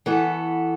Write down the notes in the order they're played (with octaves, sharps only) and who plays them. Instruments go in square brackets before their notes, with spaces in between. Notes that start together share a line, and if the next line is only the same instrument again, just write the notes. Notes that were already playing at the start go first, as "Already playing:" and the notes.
[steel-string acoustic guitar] E3 B3 F#4 A4